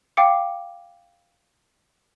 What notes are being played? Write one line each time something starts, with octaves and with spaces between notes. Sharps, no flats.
F5 G5 D6 C#7